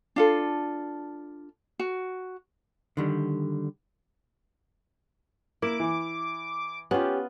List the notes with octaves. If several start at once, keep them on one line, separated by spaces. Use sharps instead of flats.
D4 F4 A4
F#4
D3 D#3 G3
A#3 E4 D6
E3
B3 C#4 F4 G4